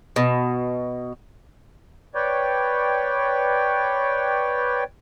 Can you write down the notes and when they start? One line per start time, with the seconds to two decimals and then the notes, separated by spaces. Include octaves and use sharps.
0.16 B2
2.15 B4 C#5 D5 G5